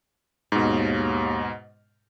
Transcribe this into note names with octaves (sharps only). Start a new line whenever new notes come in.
D#2 G#2 B2